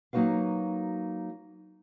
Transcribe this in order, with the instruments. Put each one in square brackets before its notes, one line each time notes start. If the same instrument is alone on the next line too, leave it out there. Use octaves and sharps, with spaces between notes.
[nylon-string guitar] F#3 A#3 D#4 F#4 B4 F5